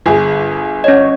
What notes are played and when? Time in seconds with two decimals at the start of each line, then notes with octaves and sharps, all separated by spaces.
0.06 G1 G#4
0.84 C#4 C#5 D#5